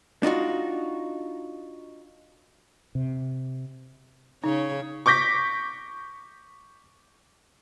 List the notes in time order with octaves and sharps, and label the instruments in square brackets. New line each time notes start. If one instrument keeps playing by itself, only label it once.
[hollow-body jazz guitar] D4 D#4 F4 F#4
[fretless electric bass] C3
[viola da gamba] C#3 C#5 [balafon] D#4
[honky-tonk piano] C#6 D6 G6 A#6 B6